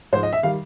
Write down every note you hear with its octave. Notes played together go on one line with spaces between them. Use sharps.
G#2 F3 C5
D#5
E5
D#3 G3 F5